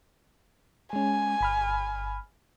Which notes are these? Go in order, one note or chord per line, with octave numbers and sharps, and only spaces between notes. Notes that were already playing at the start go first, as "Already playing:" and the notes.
G#3 C#4 G#5
G1 B5 F6